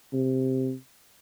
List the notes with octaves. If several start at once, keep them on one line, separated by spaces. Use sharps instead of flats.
C3